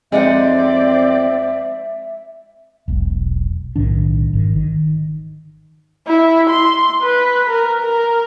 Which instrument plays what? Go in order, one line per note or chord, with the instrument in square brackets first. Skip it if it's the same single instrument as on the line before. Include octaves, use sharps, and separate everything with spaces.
[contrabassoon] F2 [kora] G#3 D#4 F#5 [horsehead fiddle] C4 D5 [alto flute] E5
[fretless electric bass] E1 B1
B1 A2 D#3 D4
G#1 D#3
D#3
[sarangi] E4
C6
B4
A#4
A#4